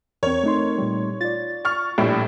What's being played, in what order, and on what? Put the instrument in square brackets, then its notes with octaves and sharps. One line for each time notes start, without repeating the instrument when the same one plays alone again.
[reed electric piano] E2 [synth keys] C4 A#4 [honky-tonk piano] C#5
[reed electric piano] A3 D#4 C6
[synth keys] A#2 G3
[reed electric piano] F4 D5 [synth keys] A6
[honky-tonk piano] C#6 F6
A#1 A2 G3